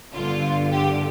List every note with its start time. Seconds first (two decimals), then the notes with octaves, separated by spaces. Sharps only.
0.12 G1 G2 D3 F4
0.70 G4